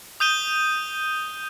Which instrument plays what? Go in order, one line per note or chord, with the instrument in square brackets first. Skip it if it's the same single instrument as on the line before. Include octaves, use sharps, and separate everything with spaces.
[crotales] D#6 G6 D#7 G7